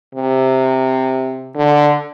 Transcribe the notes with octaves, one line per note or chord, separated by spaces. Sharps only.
C3
D3